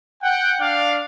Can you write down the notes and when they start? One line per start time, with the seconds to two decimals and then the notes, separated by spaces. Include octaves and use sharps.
0.23 F#5 G5
0.60 D4 D5 F5